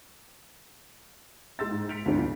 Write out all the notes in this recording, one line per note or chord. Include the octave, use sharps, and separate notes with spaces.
G#3 C6 E6 A6
G#2
B6 C#7 D7 F7
D2 G#2 C3 B3 D4
B1